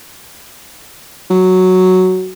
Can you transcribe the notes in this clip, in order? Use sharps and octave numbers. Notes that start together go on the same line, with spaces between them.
F#3